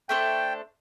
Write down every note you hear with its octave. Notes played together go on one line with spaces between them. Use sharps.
A3 D4 A4 C5 G5